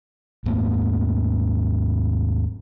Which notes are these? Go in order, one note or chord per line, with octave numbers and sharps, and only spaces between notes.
D#2 G#2 A3 A#3